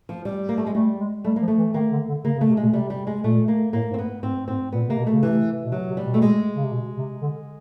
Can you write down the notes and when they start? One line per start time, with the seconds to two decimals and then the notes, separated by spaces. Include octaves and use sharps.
0.09 F3
0.25 G3
0.49 A#3
0.58 A3
0.66 G#3
0.74 G3 A3
0.99 G#3
1.25 G3 A3
1.36 F3 A#3
1.48 A3
1.57 E3
1.74 D#3 A#3
1.91 D3
2.08 D3
2.24 C#3 A#3
2.36 C#3
2.41 A3
2.49 C3
2.57 B2 G#3
2.73 C3 G3
2.90 G3
3.07 G#3
3.24 A#2 A3
3.48 A#3
3.73 A2 A#3
3.90 G#2
3.94 C4
3.99 B3
4.23 G#2 C4
4.48 G#2 C4
4.73 A#2 B3
4.88 C3 A#3
4.98 B2
5.07 A3
5.12 C#3
5.23 C3 E3
5.65 B2
5.72 C3 F#3
5.88 C3
5.97 G3
6.05 B2
6.14 A3
6.22 G#3
6.55 C#3
6.64 C3
6.71 B2
6.97 C3
7.21 D3